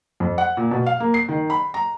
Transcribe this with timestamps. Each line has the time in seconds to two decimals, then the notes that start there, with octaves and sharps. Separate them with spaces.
0.20 F2
0.38 F#5
0.57 A#2
0.71 B2
0.86 F5
1.00 A#3
1.14 C7
1.29 D#3
1.50 B5
1.74 A#5